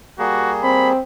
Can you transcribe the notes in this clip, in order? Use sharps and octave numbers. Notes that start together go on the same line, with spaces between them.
G3 A#3 F#4 G#4
C4 B5